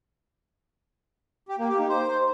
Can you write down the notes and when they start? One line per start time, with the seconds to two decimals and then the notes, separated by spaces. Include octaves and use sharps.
1.49 G4
1.59 A#3
1.69 G4
1.79 D#4
1.89 C5